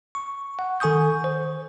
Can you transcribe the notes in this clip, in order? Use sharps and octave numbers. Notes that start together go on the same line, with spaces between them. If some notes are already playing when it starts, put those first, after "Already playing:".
C#6
F#5
D#3 A4 G#5 C#6 D#6 G6
C5